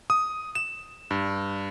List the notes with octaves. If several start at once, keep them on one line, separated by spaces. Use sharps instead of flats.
D#6
E7
G2